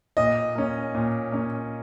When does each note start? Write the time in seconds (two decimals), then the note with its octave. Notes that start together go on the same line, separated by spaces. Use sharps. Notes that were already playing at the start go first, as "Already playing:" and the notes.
0.17 A#2 D#5
0.55 A#3 C#4
0.95 A#2
1.32 A#3 C#4